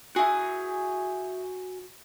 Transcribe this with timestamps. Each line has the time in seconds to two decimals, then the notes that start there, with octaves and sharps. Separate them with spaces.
0.16 E4 F#4 G#4 G#5